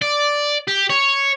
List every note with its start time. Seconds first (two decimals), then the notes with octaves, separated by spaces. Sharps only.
0.02 D5
0.68 G4
0.90 C#5